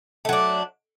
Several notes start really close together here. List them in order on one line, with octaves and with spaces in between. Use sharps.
A3 F#3 D4